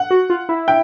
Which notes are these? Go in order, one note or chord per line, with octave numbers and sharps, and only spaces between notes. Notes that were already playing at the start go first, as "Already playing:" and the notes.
Already playing: F#5
F#4
F4
E4
G5